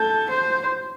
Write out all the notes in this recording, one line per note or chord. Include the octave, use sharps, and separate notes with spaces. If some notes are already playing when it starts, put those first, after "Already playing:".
Already playing: A4 G6
C5